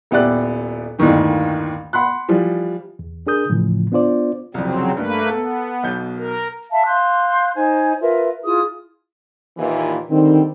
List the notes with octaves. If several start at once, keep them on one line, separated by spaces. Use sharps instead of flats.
D#1 B3 E4 G4 D5 F#6
G1 D#2 A2 D#3 E3
F#5 B5 C6 F#6
E3 F3 G3
E2
D4 G#4 A#4 D#6 G6
A2 C#3 E3 F3
B3 D4 F4 C5 D5
C2 F2 C#3 F#3 C4
G2 A3 A#3 B4
B3 A4
B1 B2 G6
A#4
E5 F5 A5 B5
F5 C6 F#6 G6
D#4 C5 G#5 G#6
F4 A#4 B4 E5
E4 F4 G#4 D#6
D#2 A#2 E3
D3 D#3 G3 C4